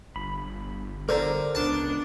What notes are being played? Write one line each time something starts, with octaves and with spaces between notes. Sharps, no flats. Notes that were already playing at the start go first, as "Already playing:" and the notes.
G1 B5
D3 A#4 C5 A#5
C#2 B3 D4 A5